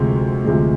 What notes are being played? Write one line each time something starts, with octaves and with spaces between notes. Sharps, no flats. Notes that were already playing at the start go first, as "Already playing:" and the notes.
Already playing: D2 C3 F3 G#3
D2 C3 F3 G#3